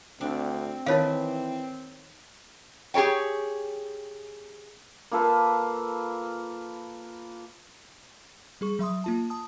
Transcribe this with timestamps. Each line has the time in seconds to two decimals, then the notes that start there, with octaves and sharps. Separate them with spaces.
0.21 D2 C4 D4
0.86 D#3 E3 D#4 B4 C#5 F5
2.94 G4 G#4 A#4 C#5 G5
5.12 A#3 F4 A4 B4
8.61 G3 G#4 C#6
8.79 F#3 E5 C6 D#6
9.04 A#3 F4 A5
9.30 A5 D#6